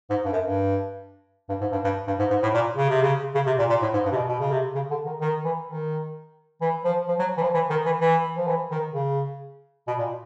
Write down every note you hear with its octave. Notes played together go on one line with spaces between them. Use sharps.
G#2
G2
F#2
G2
G2
G#2
G2
G2
G2
G#2
G#2
A2
A#2
C#3
C3
C#3
C#3
C3
A#2
A#2
A2
G#2
G2
C3
B2
B2
C#3
C3
C#3
D3
D#3
D#3
E3
D#3
E3
F3
F3
F#3
E3
F3
E3
D#3
E3
E3
F3
E3
D#3
C#3
B2
A#2